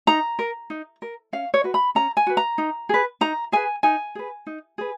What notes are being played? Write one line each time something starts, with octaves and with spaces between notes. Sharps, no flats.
D#4 A#5
A#4
D#4
A#4
C#4 F5
C#5
F#4 B4
B5
C#4 A#5
G#5
F#4 B4
A#5
D#4
G#4 B4
D#4 A#5
G#4 B4 G#5
D#4 G#5
G#4 B4
D#4
G#4 B4